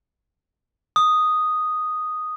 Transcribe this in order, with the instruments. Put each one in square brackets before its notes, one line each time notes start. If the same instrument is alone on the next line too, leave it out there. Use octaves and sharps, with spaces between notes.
[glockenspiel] D#6